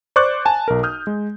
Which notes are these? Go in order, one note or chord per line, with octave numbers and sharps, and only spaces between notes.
C5 D5 C#6 D6 F#6
G#5 A5
B1 A#4
D#6 F6 G6
G#3